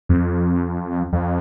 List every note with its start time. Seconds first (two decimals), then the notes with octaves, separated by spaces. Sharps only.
0.09 F2
1.13 F2